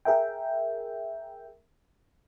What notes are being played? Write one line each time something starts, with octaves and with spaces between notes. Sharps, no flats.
G#4 A#4 E5 G5